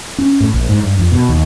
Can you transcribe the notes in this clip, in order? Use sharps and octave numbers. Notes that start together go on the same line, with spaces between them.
C#4
A2
A#1
G#2
G2
F2
B2
D#2